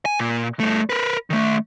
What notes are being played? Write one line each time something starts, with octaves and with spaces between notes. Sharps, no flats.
G#5
A#2
G2 A3
A#4 B4
D#3 A3